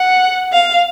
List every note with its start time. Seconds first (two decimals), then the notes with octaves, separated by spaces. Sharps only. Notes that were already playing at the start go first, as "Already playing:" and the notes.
Already playing: F#5
0.52 F5